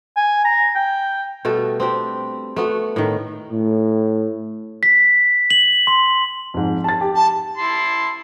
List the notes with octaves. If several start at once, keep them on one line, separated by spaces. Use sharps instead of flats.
G#5
A#5
G5
B2 G3 A3 A4
C4 D4 G4
A3 B3 F#4
A2 D#3
A2
B6
F#7
C6
F2 G#2
A5 A6
G4
A5
E4 A5 C6